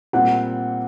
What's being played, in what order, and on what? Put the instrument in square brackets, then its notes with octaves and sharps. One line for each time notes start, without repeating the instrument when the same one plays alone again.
[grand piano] A#2 G3 C4 E4 [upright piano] F#5